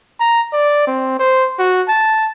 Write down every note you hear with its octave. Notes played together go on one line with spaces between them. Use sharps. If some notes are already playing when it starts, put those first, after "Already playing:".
A#5
D5
C4
C5
F#4
A5